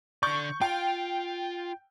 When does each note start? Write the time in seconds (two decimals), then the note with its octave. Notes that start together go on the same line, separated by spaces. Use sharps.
0.23 D3 D5 C#6 G6
0.61 F4 G5